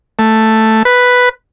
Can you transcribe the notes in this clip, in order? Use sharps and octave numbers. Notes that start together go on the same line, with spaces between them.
A3
B4